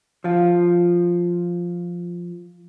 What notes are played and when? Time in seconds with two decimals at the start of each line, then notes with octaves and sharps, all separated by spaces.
0.24 F3 F4